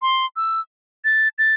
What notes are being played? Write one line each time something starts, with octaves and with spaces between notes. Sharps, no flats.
C6
E6
A6
A6